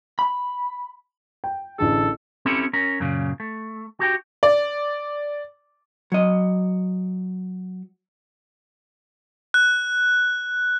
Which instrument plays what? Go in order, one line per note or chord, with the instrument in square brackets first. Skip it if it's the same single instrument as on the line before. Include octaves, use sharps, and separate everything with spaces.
[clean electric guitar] B5
[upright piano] G5
[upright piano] A1 D3 G#4 [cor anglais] A4
[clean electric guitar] C4 C#4 E4 G4 A4
C#4 A#4
F#2 A#2 C#3
A3
F#4 G4 G5
[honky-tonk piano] D5
[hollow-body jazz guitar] F#3 D#5
[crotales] F#6